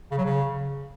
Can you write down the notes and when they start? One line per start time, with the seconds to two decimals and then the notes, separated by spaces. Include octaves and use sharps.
0.11 C#3
0.18 F#3
0.25 C#3